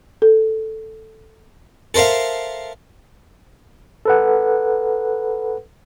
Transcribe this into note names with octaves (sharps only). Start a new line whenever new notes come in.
A4
A4 A#4 C5 E5 F5
A4 B4 F#5